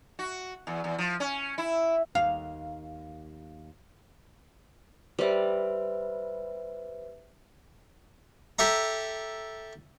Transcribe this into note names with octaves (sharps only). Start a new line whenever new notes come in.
F#4
E2
E2
F3
C#4
E4
D#2 F5
G3 B4 C5 D5 E5
G4 A4 E5 A#5